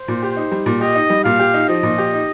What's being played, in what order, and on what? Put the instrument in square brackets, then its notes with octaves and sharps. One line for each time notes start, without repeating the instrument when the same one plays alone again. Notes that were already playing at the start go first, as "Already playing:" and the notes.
Already playing: [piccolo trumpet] C5
[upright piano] A#2
G4
D#4
G3
A#2
[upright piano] G4 [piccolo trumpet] D#5
[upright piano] D#4
G3
[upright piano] A#2 [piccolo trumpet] F5
[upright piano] G4
D#4
[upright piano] F3 [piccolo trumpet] D#5
[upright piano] A#2
G4
D#4